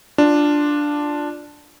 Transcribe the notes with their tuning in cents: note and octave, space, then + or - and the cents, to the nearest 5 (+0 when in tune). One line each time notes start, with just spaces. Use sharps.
D4 +0 F4 +0